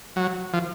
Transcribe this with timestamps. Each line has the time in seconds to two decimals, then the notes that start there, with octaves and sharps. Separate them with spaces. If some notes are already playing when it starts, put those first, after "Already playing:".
0.16 F#3
0.53 F3